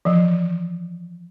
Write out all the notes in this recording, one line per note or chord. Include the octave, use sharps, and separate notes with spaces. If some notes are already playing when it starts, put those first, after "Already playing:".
E3 F3